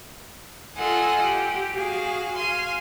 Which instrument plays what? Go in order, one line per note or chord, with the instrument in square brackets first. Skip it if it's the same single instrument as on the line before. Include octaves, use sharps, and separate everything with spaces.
[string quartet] F4 A4 D#5 F#5 G#5
G4
F#4 G#4 F5
F5 G#5 C6